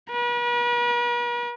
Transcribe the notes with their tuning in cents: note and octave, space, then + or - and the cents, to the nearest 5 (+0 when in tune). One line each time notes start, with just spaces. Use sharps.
B4 -45